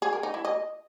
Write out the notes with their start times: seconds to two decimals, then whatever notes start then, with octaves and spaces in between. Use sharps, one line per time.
0.02 G#4
0.13 A#4
0.23 D#4
0.34 E4
0.45 D#5